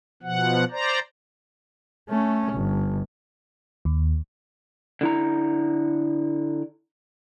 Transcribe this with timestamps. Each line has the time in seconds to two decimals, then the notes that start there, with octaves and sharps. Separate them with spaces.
0.23 B2 F3 F#5
0.71 C5 D5 A#5
2.09 A3 C#4
2.53 G1
3.85 D#2
5.01 D3 E4 A#5